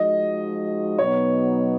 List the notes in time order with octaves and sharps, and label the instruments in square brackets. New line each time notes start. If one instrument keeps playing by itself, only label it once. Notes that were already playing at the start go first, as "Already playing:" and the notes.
Already playing: [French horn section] F3 G#3 D#4 F#4 [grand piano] D#5
[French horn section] B2 F#3 B3 D#4 [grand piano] C#5